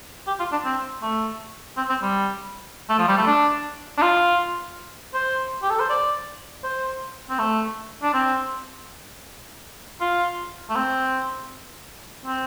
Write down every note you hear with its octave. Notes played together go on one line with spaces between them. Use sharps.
G4
F4
D4
C4
A3
C4
C4
G3
A3
F3
G3
A3
D4
D4
F4
C5
G4
A4
C5
D5
C5
C4
A3
D4
C4
F4
A3
C4
C4